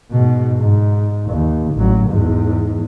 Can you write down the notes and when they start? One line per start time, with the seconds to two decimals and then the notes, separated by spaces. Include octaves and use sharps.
0.11 G#2 B2
0.59 G#2
1.30 D#2
1.75 A1 F#3
2.09 E2 G#2